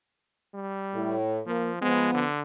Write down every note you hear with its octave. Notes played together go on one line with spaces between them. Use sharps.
G3
A2
F3 A#3
F3 G#3 B3
D3